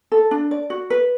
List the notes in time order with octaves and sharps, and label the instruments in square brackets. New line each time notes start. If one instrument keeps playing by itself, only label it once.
[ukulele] A4
D4
D5
F#4
B4